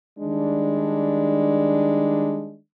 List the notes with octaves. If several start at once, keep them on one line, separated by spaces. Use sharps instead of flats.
D#3 G3 G#3 D4